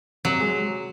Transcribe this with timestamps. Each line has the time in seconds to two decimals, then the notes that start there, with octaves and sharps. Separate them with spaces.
0.25 C3 F#3
0.40 G#3